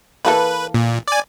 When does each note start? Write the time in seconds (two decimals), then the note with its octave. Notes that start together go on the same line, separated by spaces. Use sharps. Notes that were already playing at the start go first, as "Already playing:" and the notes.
0.25 E3 A#3 A4 B4
0.74 A#2
1.08 D5 G#5